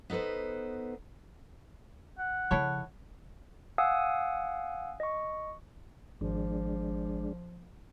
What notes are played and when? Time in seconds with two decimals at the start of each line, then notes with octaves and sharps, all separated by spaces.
0.10 B3 D#4 A4 B4 C5
2.19 F#5
2.51 C#3 F3 E4 A4 C#5
3.78 F5 F#5 G#5 D#6 E6
5.00 D#5 C#6
6.21 G#1 F3 G#3 D4